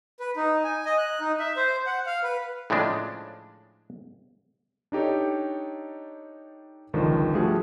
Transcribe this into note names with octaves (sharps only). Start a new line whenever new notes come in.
B4
D#4
G#5
D#5
F#6
D#4
E5
C5
F#5
F5
B4
A2 C#3 F3 G#3 D4
D4 D#4 G4 A4 C#5
G#1 C#2 D3 D#3 F3
F3 G3 A3 D4 F#4 G#4